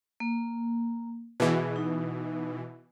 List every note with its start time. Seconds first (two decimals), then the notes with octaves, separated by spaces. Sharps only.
0.20 A#3
1.40 B2 E3 G#4
1.76 D#4